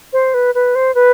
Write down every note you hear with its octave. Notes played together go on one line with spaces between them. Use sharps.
C5
B4
B4
C5
B4